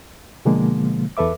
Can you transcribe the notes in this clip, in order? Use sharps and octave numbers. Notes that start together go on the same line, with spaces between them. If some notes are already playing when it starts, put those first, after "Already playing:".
B2 D3 F3 G#3 A#3
E2 A4 B4 E5 D6